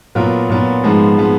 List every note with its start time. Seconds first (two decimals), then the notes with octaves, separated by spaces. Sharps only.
0.15 A#2 F#3 B3 F4 A#4
0.49 A#2 F#3 B3 F4 A#4
0.84 G#2 F3 G#3 B3
1.18 F3 G#3 B3